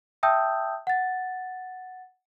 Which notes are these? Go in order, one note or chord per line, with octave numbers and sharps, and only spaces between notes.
E5 G5 A5 D#6 E6 G6
F#5 A6